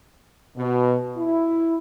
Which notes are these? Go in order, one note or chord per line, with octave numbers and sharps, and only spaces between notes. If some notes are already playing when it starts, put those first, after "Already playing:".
B2
E4